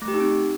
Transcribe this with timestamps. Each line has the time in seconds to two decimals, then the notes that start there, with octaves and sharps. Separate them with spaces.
0.02 A3
0.08 G4
0.14 D#4
0.20 C4